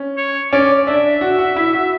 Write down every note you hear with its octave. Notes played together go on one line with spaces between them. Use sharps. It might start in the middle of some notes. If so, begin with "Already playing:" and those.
Already playing: C#4
C#5
C#4 D5
D4 E5
F#4
F#4
E4
F#4